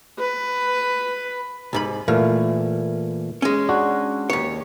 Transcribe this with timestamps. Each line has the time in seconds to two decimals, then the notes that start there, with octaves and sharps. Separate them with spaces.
0.19 B4
1.73 C2 G#2 B5
2.08 A#2 E3 A3 F5
3.42 G#3 C#4
3.69 D4 F#4
4.30 D#2 C#5